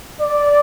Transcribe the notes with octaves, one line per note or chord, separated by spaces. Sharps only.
D5